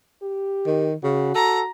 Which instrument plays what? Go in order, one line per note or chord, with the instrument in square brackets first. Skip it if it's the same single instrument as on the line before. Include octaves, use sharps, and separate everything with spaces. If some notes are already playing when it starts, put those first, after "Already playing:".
[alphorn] G4
[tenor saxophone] D#3
[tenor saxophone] C#3 [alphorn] F#4
[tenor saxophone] A4 [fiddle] A#5